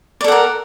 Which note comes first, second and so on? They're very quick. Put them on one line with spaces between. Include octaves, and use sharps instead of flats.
D5 A4 F#5 A#4